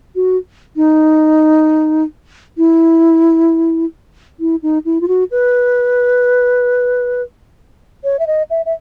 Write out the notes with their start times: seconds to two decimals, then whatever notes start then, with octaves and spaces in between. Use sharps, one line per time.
0.15 F#4
0.76 D#4
2.58 E4
4.40 E4
4.63 D#4
4.85 E4
5.01 F4
5.08 F#4
5.31 B4
8.04 C#5
8.19 E5
8.27 D#5
8.50 E5
8.66 E5